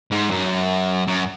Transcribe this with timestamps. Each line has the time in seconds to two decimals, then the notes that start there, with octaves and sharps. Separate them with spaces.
0.12 G#2
0.31 F#2
1.07 F#2